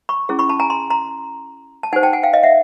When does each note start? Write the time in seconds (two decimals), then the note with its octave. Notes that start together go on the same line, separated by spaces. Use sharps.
0.09 B5 C#6
0.29 C#4 E4 G#4
0.39 B5 C#6
0.49 A5 B5
0.60 G#5 A#5
0.70 A#5 C6
0.90 A#5 C6
1.83 A5
1.93 D#4 G4 C5 F#5 G#5
2.03 G5 A5
2.13 F#5 G#5
2.23 F5 G5
2.33 D#5 F5
2.43 E5 F#5